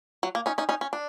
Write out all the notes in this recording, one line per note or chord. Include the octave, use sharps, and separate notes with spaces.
F#3
A#3
C#4 D#4
C#4 D#4
C#4 D#4
C#4
D4